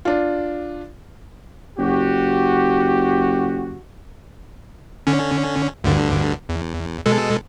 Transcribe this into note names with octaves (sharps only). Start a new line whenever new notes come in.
D4 F4
F#1 F#4 G4
D3 C#4
D2 G2 D3
E2
B2 G#3 A4